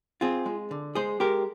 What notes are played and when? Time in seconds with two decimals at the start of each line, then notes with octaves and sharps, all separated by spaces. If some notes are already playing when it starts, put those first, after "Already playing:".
0.21 C4 F4 G#4
0.46 G#3
0.71 D3
0.95 G#3 G#4 C5
1.20 G#3 G4 A#4